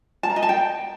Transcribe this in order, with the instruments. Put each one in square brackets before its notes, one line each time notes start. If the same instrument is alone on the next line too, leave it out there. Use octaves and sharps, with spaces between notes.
[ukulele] A5
A#5
D#5
A5
G5